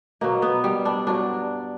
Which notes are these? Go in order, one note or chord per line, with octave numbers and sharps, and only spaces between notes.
B2 F#3 A#3
B3
G3
D4
G2 F#3 D4